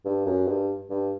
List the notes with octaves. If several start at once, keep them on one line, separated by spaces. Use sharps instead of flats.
G2
F#2
G2
G2